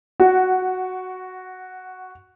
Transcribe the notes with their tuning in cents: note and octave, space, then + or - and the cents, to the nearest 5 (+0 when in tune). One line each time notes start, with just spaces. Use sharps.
F#4 +0 F#5 +15